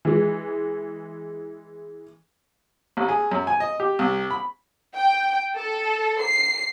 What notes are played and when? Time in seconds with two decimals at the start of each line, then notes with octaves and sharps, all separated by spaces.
0.05 E3 G#3
2.97 A1
3.09 G#4
3.32 F#2
3.47 G#5
3.60 D#5
3.80 G4
3.99 C2
4.31 B5
4.96 G5
5.58 A4
6.22 C7